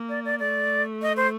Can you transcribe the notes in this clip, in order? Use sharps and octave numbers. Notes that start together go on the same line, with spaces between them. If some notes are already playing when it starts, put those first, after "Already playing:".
Already playing: A#3
D5
D5
A3 D5
D#5
C5